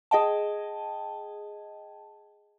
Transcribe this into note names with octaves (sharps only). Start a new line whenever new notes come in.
G#4 D#5 G5 A5